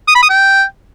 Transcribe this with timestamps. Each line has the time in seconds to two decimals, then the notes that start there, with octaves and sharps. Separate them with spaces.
0.08 D#6
0.15 B5
0.23 D#6
0.30 G5